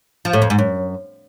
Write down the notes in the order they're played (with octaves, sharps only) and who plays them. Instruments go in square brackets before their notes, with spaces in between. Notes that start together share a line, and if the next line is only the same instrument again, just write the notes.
[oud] F3
A2
F2
G#2
F#2